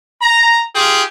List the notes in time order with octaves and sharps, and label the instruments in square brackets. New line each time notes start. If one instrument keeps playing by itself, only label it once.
[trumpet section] A#5
F4 G4 G#4